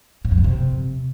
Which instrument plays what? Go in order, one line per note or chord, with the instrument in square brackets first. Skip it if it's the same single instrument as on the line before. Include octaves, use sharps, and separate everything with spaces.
[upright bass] A2
F2
A2
C3